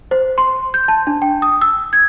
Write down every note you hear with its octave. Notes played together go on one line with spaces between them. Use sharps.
C5
C6
G6
A5
D4
G5
D#6
E6
G#6